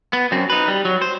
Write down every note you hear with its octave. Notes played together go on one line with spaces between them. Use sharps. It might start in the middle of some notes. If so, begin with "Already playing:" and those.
B3
F#2 C4
D#4 B4
G3
F#3
C5